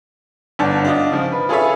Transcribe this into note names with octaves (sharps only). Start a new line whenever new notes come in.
G1 D4 C#5 F#5 A5
D4 F4 D#5
C#3 F3
B4
F4 G#4 A4 B4 C#5 E5